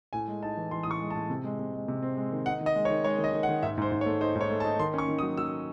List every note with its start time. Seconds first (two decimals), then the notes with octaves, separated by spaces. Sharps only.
0.13 A2 G#5
0.28 G#3
0.43 D#4 A5
0.57 E3
0.71 E3 C6
0.83 D#6
0.86 A2 C#6
1.01 G#3
1.10 A5
1.15 A2
1.30 C3
1.44 G#3
1.59 C3
1.74 G#3
1.88 C3
2.03 C4
2.17 G#3
2.32 D#3
2.46 D#4 F#5
2.61 D#3
2.66 D#5
2.76 G#3
2.85 C#5
2.90 D#3
3.04 G#3 C#5
3.18 D#3
3.24 D#5
3.34 D#3
3.43 F#5
3.49 D#3
3.63 G#2 E5
3.78 G#2 C5
3.92 G#2
4.01 C#5
4.06 A3
4.21 D#4 C5
4.35 G#2
4.41 C#5
4.50 A3
4.60 A5
4.65 D#4
4.79 D#3 C6
4.94 C#4 C#6
5.08 D#3
5.19 D#6
5.23 F#3
5.37 F#3 E6